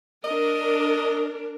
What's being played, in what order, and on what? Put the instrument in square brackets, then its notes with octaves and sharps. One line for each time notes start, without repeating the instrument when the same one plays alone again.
[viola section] D4 A#4 [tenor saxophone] D#5